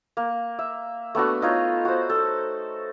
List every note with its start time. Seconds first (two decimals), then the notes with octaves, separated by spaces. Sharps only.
0.17 A#3
0.59 E5
1.15 A3 B3 D4 F#4
1.42 D#4 F4 C#5
1.85 F#4 C5
2.10 A4